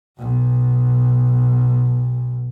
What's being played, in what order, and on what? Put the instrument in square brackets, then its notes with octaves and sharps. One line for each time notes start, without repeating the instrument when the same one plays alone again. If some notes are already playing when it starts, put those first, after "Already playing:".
[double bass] B1 B2